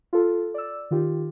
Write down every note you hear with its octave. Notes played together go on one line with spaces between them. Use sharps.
F4 A4
D5 E6
D#3 F4 G4